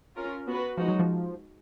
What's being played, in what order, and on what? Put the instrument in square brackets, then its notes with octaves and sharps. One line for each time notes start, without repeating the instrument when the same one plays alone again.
[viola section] C#4 F4 A#4
B3 F#4 B4
[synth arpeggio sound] F3 [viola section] G#3 D#4 F#4
[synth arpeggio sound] F#3
F3